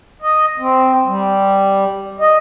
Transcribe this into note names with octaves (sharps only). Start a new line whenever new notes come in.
D#5
C4
G3
D#5